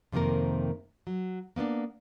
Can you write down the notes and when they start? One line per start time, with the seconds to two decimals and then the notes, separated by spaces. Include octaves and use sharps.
0.12 F2 C3 D#3 A#3 A#4
1.07 F#3
1.56 A#3 B3 C#4 D4